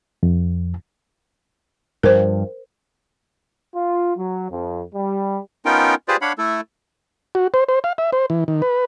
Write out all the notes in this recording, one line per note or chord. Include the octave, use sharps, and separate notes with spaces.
F2
G2 F3 A#4 C5
F4
F#3
F2
G3
B3 C#4 D#4 F4 A#4 G5
F4 G4 G#4 B4 C5 D5
D4 C#5 F5 F#5 B5
A3 E4 A4
F#4
C5
C5
F5
E5
C5
E3
D#3
B4